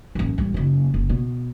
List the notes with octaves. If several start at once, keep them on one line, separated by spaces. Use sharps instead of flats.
A1 F#2
A1 G3
F#1 D#3
F#1
B2